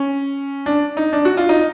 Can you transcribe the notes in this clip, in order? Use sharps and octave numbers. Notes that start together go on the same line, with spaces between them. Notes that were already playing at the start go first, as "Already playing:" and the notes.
Already playing: C#4
D4
D#4
D4
F#4
F4
D#4